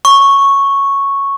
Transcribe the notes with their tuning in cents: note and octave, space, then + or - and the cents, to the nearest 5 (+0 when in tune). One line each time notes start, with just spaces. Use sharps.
C#6 -5